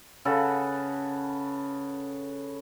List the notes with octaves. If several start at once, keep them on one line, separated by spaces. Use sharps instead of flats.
C#3 A4 B4 F#5